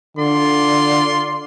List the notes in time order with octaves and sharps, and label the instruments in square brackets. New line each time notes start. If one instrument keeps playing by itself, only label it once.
[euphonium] D3 [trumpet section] F4 D5 C6